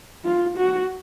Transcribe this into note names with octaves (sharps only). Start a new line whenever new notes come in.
F4
F#4